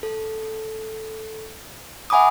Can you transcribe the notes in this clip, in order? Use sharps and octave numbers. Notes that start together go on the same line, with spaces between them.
A4
E5 F#5 G#5 B5 D6 D#6